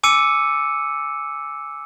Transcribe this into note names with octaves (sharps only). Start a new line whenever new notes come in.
G#5 D6 E6 C#7 D#7